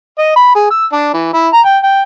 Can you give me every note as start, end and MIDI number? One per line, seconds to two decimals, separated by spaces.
0.19 0.34 75
0.36 0.54 83
0.55 0.66 68
0.71 0.86 88
0.92 1.11 62
1.14 1.30 52
1.34 1.48 64
1.53 1.61 82
1.65 1.78 79
1.84 2.03 79